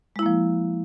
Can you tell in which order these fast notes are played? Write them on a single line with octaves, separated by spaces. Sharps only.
G#3 E4 A#3 F3